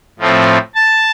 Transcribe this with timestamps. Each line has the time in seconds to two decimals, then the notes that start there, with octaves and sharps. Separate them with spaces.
0.19 A2 F3 A3 C4
0.75 A5